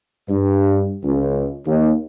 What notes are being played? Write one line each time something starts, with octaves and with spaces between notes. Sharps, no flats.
G2
C#2
D#2